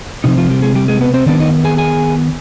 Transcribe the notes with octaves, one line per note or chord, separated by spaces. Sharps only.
C3 F3 C4 D#4
F3 F4
G3 G4
G#3 G#4
G3 G4
G#3 G#4
B3 B4
C4 C5
D#3 B3 D4 D5
D#4 D#5
G#4 G#5
G#4 G#5